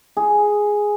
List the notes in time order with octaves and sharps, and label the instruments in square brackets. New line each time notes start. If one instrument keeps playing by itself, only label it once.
[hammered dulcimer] G#4